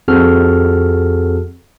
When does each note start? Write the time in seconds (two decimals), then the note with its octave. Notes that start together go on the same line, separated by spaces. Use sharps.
0.08 F2 C4 F#4 G#4 A4 F6